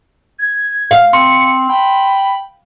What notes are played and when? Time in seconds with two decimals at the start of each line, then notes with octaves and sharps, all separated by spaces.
0.39 G#6
0.91 F5
1.13 C4 C6 C#7
1.69 G5 B5